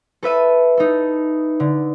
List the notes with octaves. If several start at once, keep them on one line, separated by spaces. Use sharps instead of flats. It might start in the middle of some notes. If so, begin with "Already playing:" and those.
A4 B4 E5 D#7
D#4 A4
D3